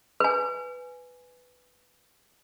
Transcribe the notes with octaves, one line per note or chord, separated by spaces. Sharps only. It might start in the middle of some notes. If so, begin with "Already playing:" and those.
B4 G#5